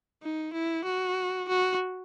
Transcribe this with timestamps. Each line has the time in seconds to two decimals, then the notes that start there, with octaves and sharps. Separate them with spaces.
0.23 D#4
0.53 E4
0.85 F#4
1.49 F#4